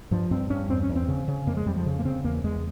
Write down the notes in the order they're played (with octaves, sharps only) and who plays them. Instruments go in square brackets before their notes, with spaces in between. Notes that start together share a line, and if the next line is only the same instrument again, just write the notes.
[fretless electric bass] G2 F3
G2 C4
G2 C#4
E2 C4
C#4
E2
C4
C#3
C#3
F2 A#3
G#3
F2 G3
F3
C#3
A#3
C#3 C4
E2 A#3
E2 G#3